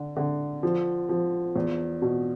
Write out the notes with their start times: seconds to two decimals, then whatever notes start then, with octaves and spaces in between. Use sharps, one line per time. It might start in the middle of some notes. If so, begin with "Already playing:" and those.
Already playing: D3
0.16 D3
0.63 F3
1.09 F3
1.56 E2
2.02 B2